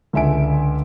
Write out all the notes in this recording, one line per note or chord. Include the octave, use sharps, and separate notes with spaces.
C#2 D3 E5 G#5 D7